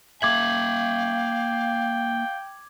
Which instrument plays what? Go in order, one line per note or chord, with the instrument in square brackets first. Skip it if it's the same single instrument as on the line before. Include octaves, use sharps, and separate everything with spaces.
[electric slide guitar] A#3 E5 [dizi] F5 [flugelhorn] G5 [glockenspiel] D6 G#6 F#7